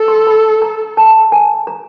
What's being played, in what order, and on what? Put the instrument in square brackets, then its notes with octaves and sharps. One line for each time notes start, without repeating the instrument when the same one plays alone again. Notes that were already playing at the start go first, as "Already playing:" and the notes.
Already playing: [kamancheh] A4
[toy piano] C6
B5
A#5
A5
G#5
A#5